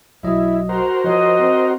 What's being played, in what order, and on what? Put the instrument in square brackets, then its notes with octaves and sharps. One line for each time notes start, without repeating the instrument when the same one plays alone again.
[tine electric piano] B1 F#3 D#5 [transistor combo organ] E4
[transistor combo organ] F#4 A#4 C5 [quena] A#5
[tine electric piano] F3 C#5 [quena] D#5
[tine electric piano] C4